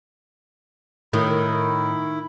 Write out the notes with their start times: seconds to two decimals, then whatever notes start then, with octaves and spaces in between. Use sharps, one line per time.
1.13 A2 D#3 E4